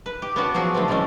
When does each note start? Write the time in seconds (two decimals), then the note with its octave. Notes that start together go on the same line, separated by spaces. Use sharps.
0.06 B4
0.22 G4
0.36 B3 C#4 D4 F#4 F#5
0.54 F3 F#3 F#4 G#4
0.74 D3 A3 B3 C4
0.88 D3 E3 G#3 A3 C#4